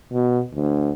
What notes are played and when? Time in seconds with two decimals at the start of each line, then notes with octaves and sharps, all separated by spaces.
0.12 B2
0.55 D2